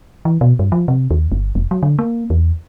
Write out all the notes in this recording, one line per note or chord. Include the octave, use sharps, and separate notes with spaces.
E3
B2
G2
F3
C3
D#2
G1
F1
F#3
D3
A#3
E2